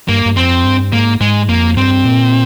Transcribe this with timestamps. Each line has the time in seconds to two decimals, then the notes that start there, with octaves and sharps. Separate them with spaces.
0.08 G2 A#3
0.26 G2
0.37 F2 C4
0.65 G2
0.92 G#2 A#3
1.21 G#2 G#3
1.49 F2 A#3
1.77 G2 C4
2.05 A#2